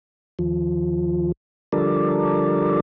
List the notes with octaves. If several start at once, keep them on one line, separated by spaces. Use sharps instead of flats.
D#2 F3
D3 F3 G3 A4 A#4 D5